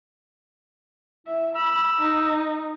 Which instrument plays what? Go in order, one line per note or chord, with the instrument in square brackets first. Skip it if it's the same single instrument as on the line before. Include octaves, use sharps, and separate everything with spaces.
[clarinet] E4 [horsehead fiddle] E5
[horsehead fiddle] B5 [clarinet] E6
[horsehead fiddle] D#4